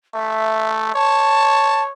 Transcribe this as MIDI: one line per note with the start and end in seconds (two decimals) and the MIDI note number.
0.14 0.91 57
0.14 0.94 76
0.94 1.92 73
0.94 1.82 81